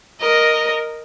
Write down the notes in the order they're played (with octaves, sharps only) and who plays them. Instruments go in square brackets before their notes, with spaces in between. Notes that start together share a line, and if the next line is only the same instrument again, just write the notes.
[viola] A#4 [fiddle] D#5